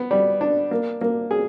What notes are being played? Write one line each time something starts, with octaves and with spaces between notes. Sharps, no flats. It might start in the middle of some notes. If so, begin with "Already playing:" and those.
Already playing: B3
G3
D4
A#3
A#3
G#4